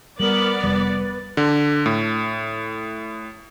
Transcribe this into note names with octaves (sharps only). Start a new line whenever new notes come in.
G3 B3 A#4 D5 F#7
F1 G3 B4 A6
D3
A2